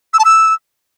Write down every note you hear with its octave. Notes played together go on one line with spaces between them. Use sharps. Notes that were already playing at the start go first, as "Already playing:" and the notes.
E6
A5
E6